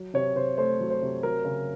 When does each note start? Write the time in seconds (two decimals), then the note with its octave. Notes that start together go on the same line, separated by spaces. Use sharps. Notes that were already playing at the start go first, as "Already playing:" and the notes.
Already playing: F#3
0.14 C3 C#5
0.36 C3 C5
0.58 A3 C5
0.80 F#3
0.90 C5
1.02 C3
1.23 F#3 A#4
1.45 C#3